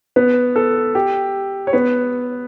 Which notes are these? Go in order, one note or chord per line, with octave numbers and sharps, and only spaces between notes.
B3 B4
A4
G4
C#5
B3 B4